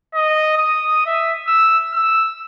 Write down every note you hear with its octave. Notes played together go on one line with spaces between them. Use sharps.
D#5
D#6
E5
E6
E6